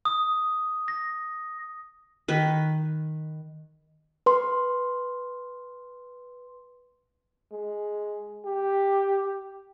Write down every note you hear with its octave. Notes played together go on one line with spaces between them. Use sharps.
D#6
A#6
D#3 B4
B4 C6
G#3
G4